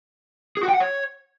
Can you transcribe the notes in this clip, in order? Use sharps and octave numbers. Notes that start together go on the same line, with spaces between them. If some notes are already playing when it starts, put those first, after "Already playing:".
G#4
F#4
G5
F#5
C#5